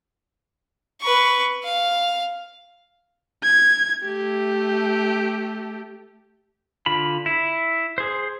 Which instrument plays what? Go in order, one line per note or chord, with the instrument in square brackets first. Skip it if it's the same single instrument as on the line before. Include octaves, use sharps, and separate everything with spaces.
[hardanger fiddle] B4 C#6
F5
[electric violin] G#6
A3 G4
[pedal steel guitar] D3 F4 B5
E4
G#4 C5